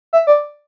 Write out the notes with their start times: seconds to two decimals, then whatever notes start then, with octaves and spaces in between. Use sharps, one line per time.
0.13 E5
0.27 D5